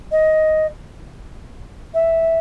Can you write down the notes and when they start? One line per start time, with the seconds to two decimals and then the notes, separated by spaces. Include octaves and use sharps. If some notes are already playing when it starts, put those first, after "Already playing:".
0.12 D#5
1.94 E5